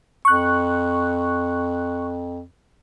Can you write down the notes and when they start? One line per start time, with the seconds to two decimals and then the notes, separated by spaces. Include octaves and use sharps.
0.25 F2 C#6 F#6